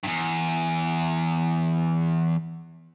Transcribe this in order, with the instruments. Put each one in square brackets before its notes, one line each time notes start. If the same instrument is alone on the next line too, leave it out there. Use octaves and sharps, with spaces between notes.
[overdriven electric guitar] E2 G2